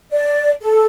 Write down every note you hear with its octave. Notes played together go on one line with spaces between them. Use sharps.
D5
A4